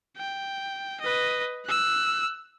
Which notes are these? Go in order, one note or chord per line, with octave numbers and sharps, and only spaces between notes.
G5
B4 D#5
E6 F#6